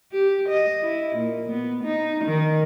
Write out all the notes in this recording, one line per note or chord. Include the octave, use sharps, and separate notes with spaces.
G4
D#5
E4
A#2
B3
D#4
D#3